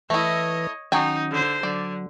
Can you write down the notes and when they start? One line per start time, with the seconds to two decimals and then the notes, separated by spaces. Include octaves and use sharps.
0.10 E3 A3 E4 B4 C#5 D#5 A#6
0.92 D#3 F#3 C#4 D#4 G5 G#5
1.31 D3 C5
1.63 D3 F#3 D5